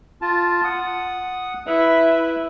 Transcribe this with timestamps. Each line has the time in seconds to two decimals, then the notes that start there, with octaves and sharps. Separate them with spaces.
0.22 F4 A5
0.64 F#5 D#6
1.67 E4 B4 E5